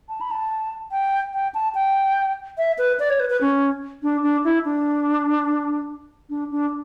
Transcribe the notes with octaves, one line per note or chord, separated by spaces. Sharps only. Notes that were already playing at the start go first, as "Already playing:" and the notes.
A5
B5
A5
G5
G5
A5
G5
E5
B4
D5
C#5
B4
B4
C#4
D4
D4
E4
D4
D4
D4